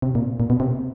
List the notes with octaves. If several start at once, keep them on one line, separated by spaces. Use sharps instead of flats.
C3
A#2
A#2
B2
C3